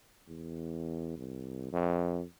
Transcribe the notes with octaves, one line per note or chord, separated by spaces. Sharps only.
E2
C2
F2